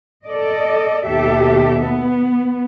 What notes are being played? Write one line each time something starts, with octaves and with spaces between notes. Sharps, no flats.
A4 D5 D#5
D#2 B2 G4 A4 E5
B3